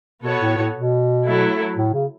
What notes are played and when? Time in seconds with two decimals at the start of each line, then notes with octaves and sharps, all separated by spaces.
0.23 B2 B3 F#4 A4 C#5
0.41 A2
0.57 A2
0.74 B2
1.25 F#3 A3 E4 A4
1.77 A2
1.94 C#3